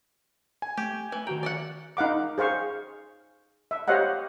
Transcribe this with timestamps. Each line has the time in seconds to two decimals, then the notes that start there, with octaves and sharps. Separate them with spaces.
0.62 G#5
0.77 A3 G4
1.12 E3
1.27 D#3 F#4 G5 A#5
1.43 D5 D#5 F#5
1.97 D#4 F5 F#5 D6
2.38 G#4 C5 F5 C#6
3.71 E5
3.88 G4 C5 C#5 D#5 F5 F#5